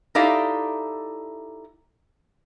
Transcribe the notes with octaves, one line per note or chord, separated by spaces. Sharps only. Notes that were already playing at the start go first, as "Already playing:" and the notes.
D#4 E4 G4 A4 D5 F5